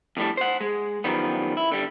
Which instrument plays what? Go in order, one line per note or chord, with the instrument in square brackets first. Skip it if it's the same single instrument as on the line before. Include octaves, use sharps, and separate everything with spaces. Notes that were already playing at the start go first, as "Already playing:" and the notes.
[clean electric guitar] F2 A2 G3 D4
C5 F#5
G#3
F#2 D#3 F3 G3 B3
E4
D3 G3